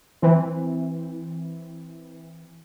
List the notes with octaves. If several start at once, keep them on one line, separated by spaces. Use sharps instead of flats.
E3 C4